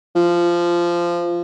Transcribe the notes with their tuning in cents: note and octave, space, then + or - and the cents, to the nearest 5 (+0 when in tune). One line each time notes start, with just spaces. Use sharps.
F3 -15